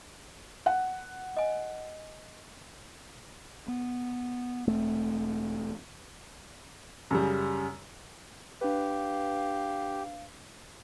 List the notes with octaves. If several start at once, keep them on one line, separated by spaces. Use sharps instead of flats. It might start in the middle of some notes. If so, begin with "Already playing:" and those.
F#5
D#5 G#5
B3
E1 A3 C4
F#2 C#3 G3
D4 G4 B4 F5